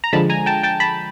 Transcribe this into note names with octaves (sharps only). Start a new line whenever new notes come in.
A#5
D3 F3 G#3 A5 B5
G#5 A#5
G5 A5
G5 A5
A5 B5